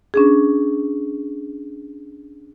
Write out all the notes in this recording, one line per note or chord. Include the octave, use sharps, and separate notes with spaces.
C#4 D4 G#4